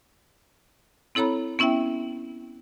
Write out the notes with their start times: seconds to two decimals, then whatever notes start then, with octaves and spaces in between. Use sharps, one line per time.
1.15 C4 E4 A4 C#5 A#5 B5
1.59 B3 C#4 E4 E5 G5